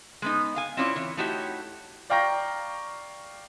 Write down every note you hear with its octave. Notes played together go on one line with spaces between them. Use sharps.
G#3 B3 D#4
F5 G#5
C4 C#4 E4 F4 C#5 D5
E3 C#5
A3 D#4 E4 F#4 G4 C#5
D5 F5 G5 A#5 C#6 A#6